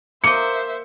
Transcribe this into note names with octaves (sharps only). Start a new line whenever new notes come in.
A#3 C5 D#5 E5 C#7